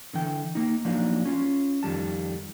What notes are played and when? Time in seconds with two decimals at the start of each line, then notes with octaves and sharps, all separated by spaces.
0.14 D3 E3 G5
0.55 A#3 D#4
0.85 F3 F#3 A#3 D4 D#4
1.25 C#4 F4
1.83 F2 D#3 G3 A5